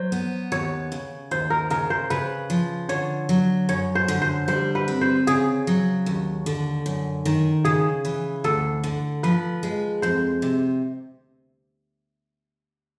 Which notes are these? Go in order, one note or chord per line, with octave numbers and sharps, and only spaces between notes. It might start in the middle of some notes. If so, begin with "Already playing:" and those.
Already playing: F#3 C5
B3
D#2 C#5
C#3
D#2 C5
A#4
C#3 A#4
C5
C#3 B4
F3
D3 C#5
F#3
F#2 C#5
C5
D3
C5
G3 C5
B4
C4
C5
C#3 G#4
F#3
D#2
D3
F#2
D#3
C#3 G#4
E3
D2 A4
D3
F3 B4
G#3
F2 C5
C3